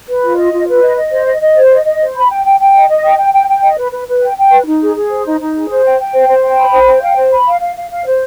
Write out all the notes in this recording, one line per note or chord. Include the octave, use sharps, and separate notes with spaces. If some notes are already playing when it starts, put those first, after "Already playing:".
B4
F4
D#5
F4
B4
D#5
D#5
C5
D#5
D#5
C5
D#5
D#5
C5
B5
G5
G5
G5
D#5
D#5
G5
G5
G5
G5
D#5
B4
B4
B4
G5
G5
B4
D#4
G#4
G#4
C5
D#4
D#4
G#4
C5
G5
G5
C5
C5
G5
B5
C5
G5
F5
C5
B5
F5
F5
F5
F5
C5